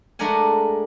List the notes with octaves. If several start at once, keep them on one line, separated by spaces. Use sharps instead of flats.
G#3 A3 D4 A#4 F#5 G#5